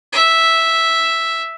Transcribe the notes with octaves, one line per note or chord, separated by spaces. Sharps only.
E5